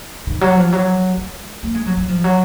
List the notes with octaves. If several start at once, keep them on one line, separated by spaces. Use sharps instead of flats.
D#3
F#3
F3
F#3
G#3
A#3
G#3
F#3
F#3
F3
F#3